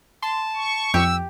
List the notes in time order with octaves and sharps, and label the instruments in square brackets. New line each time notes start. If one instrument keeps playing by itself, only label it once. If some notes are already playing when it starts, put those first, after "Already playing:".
[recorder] A5 [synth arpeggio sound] C6
[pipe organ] C#6
[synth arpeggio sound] F2 [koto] G4 [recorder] E6